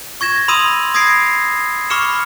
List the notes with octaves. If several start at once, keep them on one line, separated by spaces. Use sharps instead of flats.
C#6 G#6 A#6 E7
B5 C6 D#6 E6 D#7 E7
B5 D#6 G#6 A#6 C7 D7
B5 C#6 D6 F6 C#7 E7